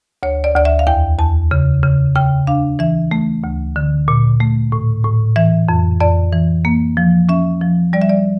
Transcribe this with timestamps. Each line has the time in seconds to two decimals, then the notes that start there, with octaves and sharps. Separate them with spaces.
0.23 D2 C#5
0.44 D5
0.55 D2 D5
0.65 E5
0.79 F5
0.87 E2 G5
1.18 E2 A5
1.51 C#3
1.83 C#3
2.15 C#3 G5
2.47 D4 F5
2.79 E3 E5
3.11 A3
3.44 D2
3.76 D3
4.08 A#2
4.40 A3
4.72 A2
5.04 A2
5.36 E3 E5
5.69 F2
6.00 F2 D5
6.33 E3
6.65 A#3
6.97 F3
7.29 C#4 E5
7.61 F3
7.93 G3 D5
8.02 E5
8.09 D5